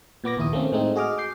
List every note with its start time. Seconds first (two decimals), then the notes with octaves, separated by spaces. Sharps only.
0.24 A#2 B3 D6 A#6
0.37 A#1 D#2 E4 D#6
0.52 D#3 A3 A#3 C4 C#4
0.72 A2 G#3 A3 C4 D#4
0.95 F#4 G#4 D#5 D6 F6
1.18 D6 G6 C7